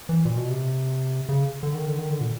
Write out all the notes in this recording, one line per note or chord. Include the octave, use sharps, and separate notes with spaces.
E3
A#2
B2
C3
C#3
D3
D#3
D3
D#3
D3
A#2